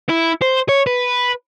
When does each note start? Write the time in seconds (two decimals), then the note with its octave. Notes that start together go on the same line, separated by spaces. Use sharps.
0.09 E4
0.42 C5
0.69 C#5
0.86 B4